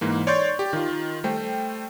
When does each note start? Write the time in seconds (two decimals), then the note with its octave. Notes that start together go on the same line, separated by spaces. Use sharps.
0.01 G#2 E3 A#3
0.27 C#5 D5 C6 C#6 G6 A6
0.59 G4
0.73 D#3 F4
1.24 G3 A3 C5 G5